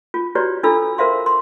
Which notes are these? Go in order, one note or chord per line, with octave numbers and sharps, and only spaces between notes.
F4
E4 F#4 G4 B4 C#5 D5
D4 E4 F4 A4 B5 E6
A#4 C5 E5 F5 C6
C6